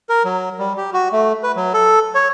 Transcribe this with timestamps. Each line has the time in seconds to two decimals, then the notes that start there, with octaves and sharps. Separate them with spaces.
0.09 A#4
0.24 F#3
0.59 G3
0.77 G4
0.94 F#4
1.12 A3
1.43 B4
1.56 F#3
1.74 A4
2.15 C#5